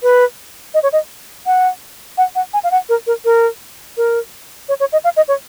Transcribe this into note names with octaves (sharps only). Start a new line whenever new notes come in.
B4
D#5
C#5
D#5
F#5
F#5
F#5
G#5
F5
F#5
A#4
A#4
A#4
A#4
C#5
C#5
D#5
F5
D#5
C#5